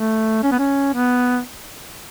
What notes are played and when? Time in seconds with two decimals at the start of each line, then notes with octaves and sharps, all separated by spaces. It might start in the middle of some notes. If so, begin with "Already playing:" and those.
Already playing: A3
0.43 C#4
0.51 B3
0.59 C#4
0.94 B3